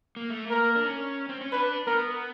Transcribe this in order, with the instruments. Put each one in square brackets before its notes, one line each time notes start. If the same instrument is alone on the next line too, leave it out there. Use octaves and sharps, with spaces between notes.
[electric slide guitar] A#3
A3
A#3
[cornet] A#4
[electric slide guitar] D4
C#4
C4
C#4
[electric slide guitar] D4 [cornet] B4
[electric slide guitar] B3 [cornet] A#4